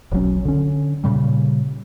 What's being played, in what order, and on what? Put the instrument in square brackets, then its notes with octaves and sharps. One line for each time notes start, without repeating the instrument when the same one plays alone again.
[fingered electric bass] D1 B1 F#3 C#4
D3 C#4
A#2 C#3 G3